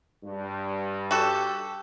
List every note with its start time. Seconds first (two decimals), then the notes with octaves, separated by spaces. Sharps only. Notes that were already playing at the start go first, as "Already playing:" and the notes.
0.24 G2
1.11 F#4 G4 A4